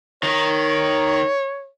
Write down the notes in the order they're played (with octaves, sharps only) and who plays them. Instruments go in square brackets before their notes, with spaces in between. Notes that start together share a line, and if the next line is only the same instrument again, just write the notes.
[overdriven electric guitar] D#3 D#4 [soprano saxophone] C#5